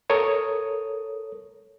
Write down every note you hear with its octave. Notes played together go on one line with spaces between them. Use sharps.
A4 A#4 C#5 D#6